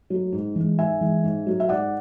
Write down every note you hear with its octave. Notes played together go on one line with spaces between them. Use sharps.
F#3 A3
G#2
E3 G#3
G#2 E5 G#5
E3 G#3
G#2
F#3 A3
E5
G#2 D5 F#5